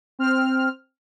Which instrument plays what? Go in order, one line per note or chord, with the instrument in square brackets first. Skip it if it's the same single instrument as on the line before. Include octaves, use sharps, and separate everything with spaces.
[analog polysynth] C4 F6